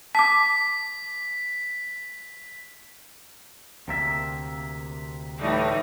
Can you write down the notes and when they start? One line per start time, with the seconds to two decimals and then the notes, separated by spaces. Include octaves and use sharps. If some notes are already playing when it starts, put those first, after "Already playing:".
0.15 A5 D6 B6
3.88 D2 C3 A#3 E5
5.41 A2 E3 G3 A3 D#4